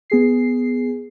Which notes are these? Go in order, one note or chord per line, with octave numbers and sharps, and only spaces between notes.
B3 G#4 C7